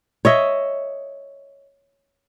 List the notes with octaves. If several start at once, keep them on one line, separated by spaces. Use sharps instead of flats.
C#5 D#5 E5